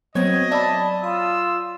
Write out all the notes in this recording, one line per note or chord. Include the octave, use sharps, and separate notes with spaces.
F#3 B3 C4 C#5 D#5 G#6
D5 E5 A5 B5
F4 D#6 E6